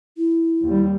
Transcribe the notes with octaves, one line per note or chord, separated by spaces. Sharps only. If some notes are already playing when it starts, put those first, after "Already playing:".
E4
D#2 G3